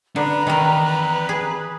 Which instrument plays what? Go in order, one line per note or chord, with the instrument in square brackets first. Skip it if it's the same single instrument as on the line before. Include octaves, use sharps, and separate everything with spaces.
[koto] D3 [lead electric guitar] D4 [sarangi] B4 [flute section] A#5
[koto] D#3 A#4 [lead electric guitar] E3 D5
[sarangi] B4
[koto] G#4